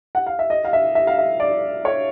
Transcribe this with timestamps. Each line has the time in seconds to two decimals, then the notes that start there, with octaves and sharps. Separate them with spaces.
0.15 F#5
0.27 F5
0.39 E5
0.50 D#5
0.65 F5
0.73 E5
0.95 E5
1.07 F5
1.18 E5
1.40 D5
1.85 C#5